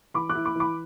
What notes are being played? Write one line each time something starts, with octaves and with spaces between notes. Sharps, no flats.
E3 B5 D6
D6 F#6
E4
B5 D6
E3 B5 D6